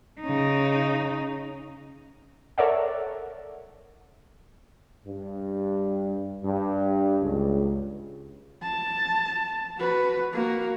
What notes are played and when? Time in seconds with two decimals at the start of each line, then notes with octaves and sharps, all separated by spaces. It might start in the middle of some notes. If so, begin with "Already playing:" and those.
0.21 C#3 D#4
2.58 A4 A#4 C#5 D5 E5 F#5
5.05 G2
6.43 G2
7.22 C#2
8.63 A5
9.79 F#4 B4
10.33 A#3 F#4